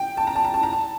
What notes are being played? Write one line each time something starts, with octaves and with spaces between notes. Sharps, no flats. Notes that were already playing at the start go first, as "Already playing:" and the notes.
Already playing: G5
A5
A#5
A5
A#5
A5
A#5
A5